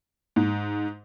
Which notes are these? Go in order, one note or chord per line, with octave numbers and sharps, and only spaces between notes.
G#2